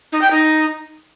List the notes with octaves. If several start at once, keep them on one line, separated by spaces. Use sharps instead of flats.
D#4
G5
D#4